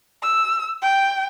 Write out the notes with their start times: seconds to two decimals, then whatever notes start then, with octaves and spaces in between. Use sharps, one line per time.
0.23 E6
0.82 G5